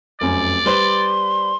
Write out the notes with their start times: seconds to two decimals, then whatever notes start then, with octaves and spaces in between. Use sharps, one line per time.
0.21 F1 F#2 D5
0.66 G3 B4 C5 C6